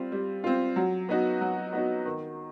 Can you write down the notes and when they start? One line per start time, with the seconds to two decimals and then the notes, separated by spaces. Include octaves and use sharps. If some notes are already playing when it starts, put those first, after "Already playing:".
Already playing: G3 C4 F4
0.12 G3
0.44 C4 F4
0.76 F#3
1.09 B3 D#4 F#4
1.41 F#3
1.73 B3 D#4 F#4
2.05 D#3